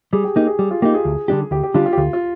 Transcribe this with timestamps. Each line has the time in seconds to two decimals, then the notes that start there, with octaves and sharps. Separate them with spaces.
0.13 G3 G#4
0.24 G4
0.36 A#3 D#4 G4
0.47 G#4
0.59 G3 G4
0.71 F4
0.82 A#3 D#4 G4
0.94 G#4
1.05 D2
1.28 D3 G3 D4 G4
1.51 D2 G4
1.63 G4
1.74 D3 G3 D4 F4 G4
1.86 F4
1.93 G4
1.97 D2 F4
2.13 F4